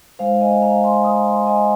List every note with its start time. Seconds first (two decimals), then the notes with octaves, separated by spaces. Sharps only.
0.19 G#3 D#4 C5 F5
0.41 D#5 G#5
0.62 F5 A#5
0.84 G#5 C6
1.04 A#5 D#6
1.26 G#5 C6
1.47 D#5 G#5